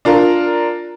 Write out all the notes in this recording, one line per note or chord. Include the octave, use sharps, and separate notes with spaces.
D4 F4 A#4